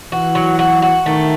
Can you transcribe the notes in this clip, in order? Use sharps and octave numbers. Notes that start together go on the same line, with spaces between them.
E3 F#4
F#3
F#4
F#4
D#3 A3